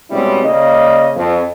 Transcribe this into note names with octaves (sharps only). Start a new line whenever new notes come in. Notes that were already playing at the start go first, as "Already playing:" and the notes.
B2 G3 G#3 C4 C#4 E4
C#3 A#3 D5 D#5
F2